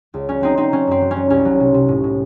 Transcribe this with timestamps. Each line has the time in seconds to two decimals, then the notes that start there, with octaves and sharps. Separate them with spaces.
0.14 C#2
0.29 F#3 C#4
0.41 F#3 C4 D#4
0.57 F#3 C4 D#4
0.72 F#3 C#4
0.87 F#2 C4
1.01 F#3
1.11 C#4
1.16 F#3
1.30 C2 C#4
1.45 F#3
1.60 C3
1.74 C3
1.89 A2
2.04 A2